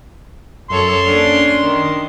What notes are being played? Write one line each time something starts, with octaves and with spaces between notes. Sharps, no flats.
F#2 A4 C#5 C6
A#3 C#4 D4
D#3